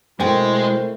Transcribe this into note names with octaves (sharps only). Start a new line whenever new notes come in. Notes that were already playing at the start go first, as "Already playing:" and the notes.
B2 G#3 A3 C4 E4 A#4 G5